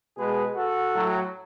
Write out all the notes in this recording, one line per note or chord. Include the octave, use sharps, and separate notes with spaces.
B2 G#3 G#4 B4
F#4 A4
A2 F#3